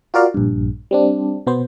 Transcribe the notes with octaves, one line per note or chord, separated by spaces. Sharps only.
F4 F#4 A#4 D5 F5
A#1 G2
G3 C4 D4
B2 B3 C5